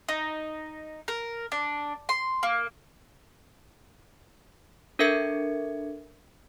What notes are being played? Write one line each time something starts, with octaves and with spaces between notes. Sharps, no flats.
D#4
A#4
D4
C6
A#3
D4 A4 A#4 E5 G#6 C#7